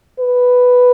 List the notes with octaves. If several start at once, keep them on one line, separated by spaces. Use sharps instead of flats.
B4